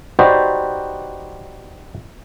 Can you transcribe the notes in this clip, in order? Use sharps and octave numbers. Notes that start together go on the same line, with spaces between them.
D#4 F#4 G4 B4 C5 D5